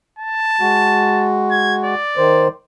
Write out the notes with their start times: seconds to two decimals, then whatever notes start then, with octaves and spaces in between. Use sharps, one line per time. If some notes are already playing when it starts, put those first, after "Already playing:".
0.19 A5
0.61 G#3 F#4
1.51 G#6
1.85 D5
2.17 D#3 C5